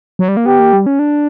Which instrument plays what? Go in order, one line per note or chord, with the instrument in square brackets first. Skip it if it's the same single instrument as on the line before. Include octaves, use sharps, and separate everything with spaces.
[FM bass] F#3
G3
A#3
[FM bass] B3 [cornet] G4
[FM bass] A#3
G3
C#4
D4